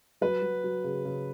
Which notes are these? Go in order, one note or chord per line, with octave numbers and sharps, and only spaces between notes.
F#3 B4
F#3
F#3
C#3
C#3